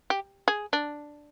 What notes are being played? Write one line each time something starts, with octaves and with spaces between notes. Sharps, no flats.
G4
G#4
D4